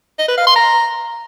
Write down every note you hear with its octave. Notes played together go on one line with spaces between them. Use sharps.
D#5
B4
F5
C6
A#5